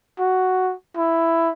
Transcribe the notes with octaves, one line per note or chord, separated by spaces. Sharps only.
F#4
E4